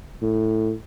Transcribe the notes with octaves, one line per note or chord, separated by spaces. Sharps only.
A2